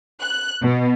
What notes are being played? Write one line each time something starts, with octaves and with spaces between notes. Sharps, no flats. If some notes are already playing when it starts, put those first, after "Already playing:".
F#6
B2